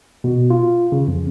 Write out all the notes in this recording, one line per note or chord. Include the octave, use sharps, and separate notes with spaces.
B2
F4
C#3
F2